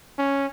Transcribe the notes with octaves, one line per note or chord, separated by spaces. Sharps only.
C#4